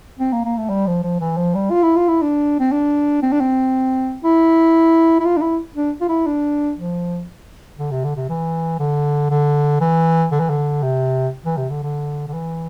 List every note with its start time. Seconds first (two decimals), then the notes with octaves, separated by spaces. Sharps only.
0.20 C4
0.32 A#3
0.45 A#3
0.57 A3
0.69 G3
0.87 F3
1.03 F3
1.21 E3
1.37 F3
1.55 G3
1.71 F4
1.83 E4
1.96 F4
2.09 E4
2.22 D4
2.60 C4
2.72 D4
3.23 C4
3.32 D4
3.40 C4
4.24 E4
5.20 E4
5.25 F4
5.37 D4
5.42 E4
5.76 D4
6.01 F4
6.09 E4
6.26 D4
6.77 F3
7.79 D3
7.91 C3
8.04 D3
8.16 C3
8.29 E3
8.80 D3
9.30 D3
9.81 E3
10.32 D3
10.40 E3
10.50 D3
10.83 C3
11.45 E3
11.58 C3
11.70 D3
11.83 D3
12.28 D3
12.34 E3